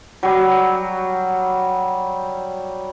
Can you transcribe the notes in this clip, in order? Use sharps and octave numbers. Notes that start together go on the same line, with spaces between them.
F#3 G3